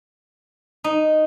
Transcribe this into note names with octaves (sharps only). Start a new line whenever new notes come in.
D#4